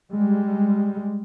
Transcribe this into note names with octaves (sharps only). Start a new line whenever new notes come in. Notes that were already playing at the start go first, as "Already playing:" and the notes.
G3 G#3